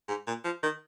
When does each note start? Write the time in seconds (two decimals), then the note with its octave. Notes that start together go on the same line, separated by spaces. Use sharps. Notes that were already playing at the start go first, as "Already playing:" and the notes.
0.08 G#2
0.27 A#2
0.44 F3
0.63 D#3